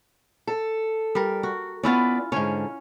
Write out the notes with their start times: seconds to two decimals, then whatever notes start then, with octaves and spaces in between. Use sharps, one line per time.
0.47 A4
1.15 G3 A#4
1.43 F#4
1.83 B3 C#4 E4 F4 B4 D5
2.32 G#2 D3 C#4 C#5